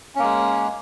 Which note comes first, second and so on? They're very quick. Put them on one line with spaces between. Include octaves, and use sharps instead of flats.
C#4 A#3 G#3